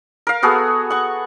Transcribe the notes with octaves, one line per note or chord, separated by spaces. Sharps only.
A#4 F5
B3 F#4 G#4 A4
F#5 C#6